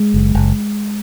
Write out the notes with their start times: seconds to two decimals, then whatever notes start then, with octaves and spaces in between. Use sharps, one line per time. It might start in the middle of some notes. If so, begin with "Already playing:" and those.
Already playing: G#3
0.14 F#1
0.35 F#1